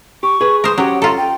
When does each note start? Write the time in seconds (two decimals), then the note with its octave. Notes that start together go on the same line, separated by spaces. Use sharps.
0.23 G4 C#6
0.41 G#4 B4
0.64 A#4 C5 D#6
0.78 F#3 C#4 G4 F#5
1.02 F4 A4 A#5
1.17 G5